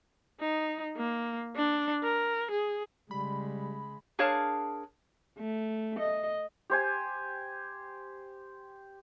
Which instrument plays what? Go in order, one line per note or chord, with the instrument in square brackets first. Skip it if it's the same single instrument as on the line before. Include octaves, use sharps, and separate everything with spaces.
[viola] D#4
A#3
D4
A#4
G#4
[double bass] C#3 G#3 [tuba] G3 [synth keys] B5
[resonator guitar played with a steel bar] D4 G#4 A#4 C#5 F5 A5
[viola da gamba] A3
D#5
[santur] G4 C5 G#5